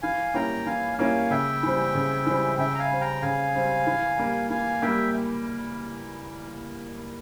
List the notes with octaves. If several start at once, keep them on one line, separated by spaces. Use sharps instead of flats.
E3 F5 G#5
G3 A#3 C#4 E4 G5 A#5
E3 F5 G#5
G3 A#3 C#4 E4 F5 G#5
C#3 E5 G5
E3 G3 C4
C#3
E3 G3 C4
C#3 E5 G5
A#5
F5 G#5
G3 C4
G5 A#5
C#3 F5 G#5
G3 C4
E3
G3 A#3
E3 F5 G#5
G3 A#3 E5 G5